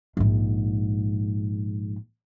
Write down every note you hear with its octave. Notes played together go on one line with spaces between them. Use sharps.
A#1 G#2